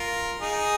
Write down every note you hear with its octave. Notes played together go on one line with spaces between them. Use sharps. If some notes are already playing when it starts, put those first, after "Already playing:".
Already playing: F4 A#4
D#4 G#4